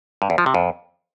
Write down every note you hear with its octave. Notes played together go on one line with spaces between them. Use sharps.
G2
E2
F3
C3
F2